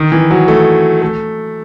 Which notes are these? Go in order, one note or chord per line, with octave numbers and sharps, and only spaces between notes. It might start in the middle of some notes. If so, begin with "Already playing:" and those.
Already playing: D#3
E3
F#3
A3
A3